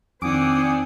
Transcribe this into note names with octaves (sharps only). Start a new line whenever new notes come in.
F2 D#3 C4 D4 F#5 G#5 D6 D#6